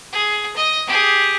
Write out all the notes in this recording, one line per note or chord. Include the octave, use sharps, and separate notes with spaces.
G#4
D#5
G4 G#4